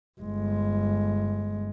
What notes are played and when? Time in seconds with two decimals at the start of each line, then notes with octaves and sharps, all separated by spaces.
0.20 G1 G#3